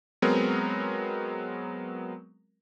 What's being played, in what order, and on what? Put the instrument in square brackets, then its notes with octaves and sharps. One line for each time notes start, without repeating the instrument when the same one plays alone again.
[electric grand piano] F#3 G#3 B3 C4 A#4